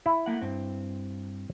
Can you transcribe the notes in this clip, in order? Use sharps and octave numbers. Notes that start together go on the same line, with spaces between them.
E4
A3 A#3 F#5
G2 C4